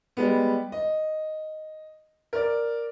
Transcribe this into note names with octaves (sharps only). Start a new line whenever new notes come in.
G3 G#3 B3
D#5
A#4 D5